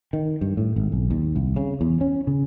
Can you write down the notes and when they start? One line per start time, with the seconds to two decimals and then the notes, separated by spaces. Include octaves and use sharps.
0.13 D#3
0.41 G2
0.57 A2
0.76 G#1
0.92 B1
1.10 D#2
1.36 C2
1.56 C#3
1.81 E2
2.01 C#4
2.27 C#3